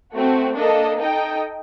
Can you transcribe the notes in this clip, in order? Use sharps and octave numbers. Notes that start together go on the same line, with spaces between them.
A3 C4 F#4
A#3 D4 A4 D#5
D#4 A4 D#5 G5